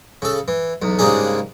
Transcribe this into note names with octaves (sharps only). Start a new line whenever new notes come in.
C#3 A4
E3
B1 E2
G#2 C#3 G3 A#3 D4 G#4